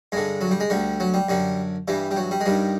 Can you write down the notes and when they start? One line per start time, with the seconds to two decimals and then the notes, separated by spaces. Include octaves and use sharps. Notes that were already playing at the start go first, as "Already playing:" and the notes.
0.12 G2 D3 G#3
0.41 F#3
0.51 G3
0.60 G#3
0.70 D2 D3 G3
1.00 F#3
1.14 G3
1.28 F#2 D3 G3
1.88 G2 E3 G3
2.11 G3
2.16 F#3
2.31 G3
2.41 G#3
2.46 G2 D#3 G3